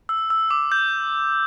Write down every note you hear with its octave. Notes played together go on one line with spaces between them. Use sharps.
E6
E6
D6
G6